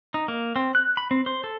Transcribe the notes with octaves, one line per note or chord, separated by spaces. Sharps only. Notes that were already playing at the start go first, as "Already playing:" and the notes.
D#4
A#3
C4
F#6
B5
C4
C5
A4